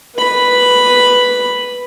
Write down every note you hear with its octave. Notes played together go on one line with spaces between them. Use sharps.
B4 B5